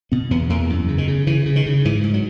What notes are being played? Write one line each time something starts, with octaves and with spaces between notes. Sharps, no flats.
B2 B3
E2 B3
E2 A#3
F#2
C#3
D#3
C#3
C#3 E3
C#3
D#3
C#3
G#2 E3
G#2
F#3